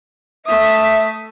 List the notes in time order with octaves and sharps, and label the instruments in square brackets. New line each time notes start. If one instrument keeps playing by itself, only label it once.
[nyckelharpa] A3 D#6 [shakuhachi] E5